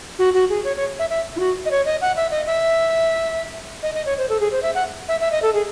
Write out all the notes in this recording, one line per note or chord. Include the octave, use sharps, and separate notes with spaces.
F#4
F#4
G#4
C#5
C#5
E5
E5
E4
F#4
D#5
C#5
D#5
F#5
E5
D#5
E5
D#5
D#5
C#5
C5
A4
G#4
C5
E5
F#5
E5
E5
D#5
A4
G#4